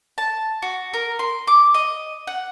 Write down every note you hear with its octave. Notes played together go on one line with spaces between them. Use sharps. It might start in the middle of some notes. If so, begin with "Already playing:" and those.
A5
F#4
A#4
C6
D6
D#5
F#5